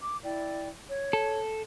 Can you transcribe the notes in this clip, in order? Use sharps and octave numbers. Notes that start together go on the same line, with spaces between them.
D6
E4 D5 G5
C#5
A4